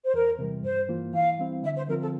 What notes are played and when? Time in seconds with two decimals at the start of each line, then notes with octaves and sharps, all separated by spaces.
0.05 C5
0.14 E2 A#4
0.39 C3 E3 G3
0.63 G2 C5
0.89 E3 A#3 F4
1.13 E3 F5
1.38 G3 C4 E4
1.63 D3 E5
1.76 C5
1.88 F3 C4 F4 A#4
2.01 A4